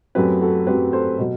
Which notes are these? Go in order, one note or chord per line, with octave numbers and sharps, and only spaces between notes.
F#2 F#3 A3 C4 G4 B4
F#4 A4
F#2 F#3 A3 C4 G4 B4
A4 C5
B2 F#3